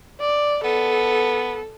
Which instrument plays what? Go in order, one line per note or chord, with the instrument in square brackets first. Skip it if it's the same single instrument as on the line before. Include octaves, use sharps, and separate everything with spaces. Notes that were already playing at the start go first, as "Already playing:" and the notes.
[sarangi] D5
[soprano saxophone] B3 [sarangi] A4